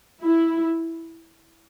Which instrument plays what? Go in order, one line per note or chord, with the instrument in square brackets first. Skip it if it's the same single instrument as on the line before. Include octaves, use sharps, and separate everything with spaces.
[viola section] E4